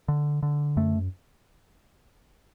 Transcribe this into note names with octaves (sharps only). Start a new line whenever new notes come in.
D3
D3
F#2 A3